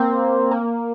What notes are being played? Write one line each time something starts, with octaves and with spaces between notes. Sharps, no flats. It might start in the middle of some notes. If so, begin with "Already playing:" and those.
Already playing: A#3 C4
A#3